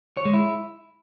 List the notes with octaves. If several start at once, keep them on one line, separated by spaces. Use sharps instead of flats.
C#5
G#3
E4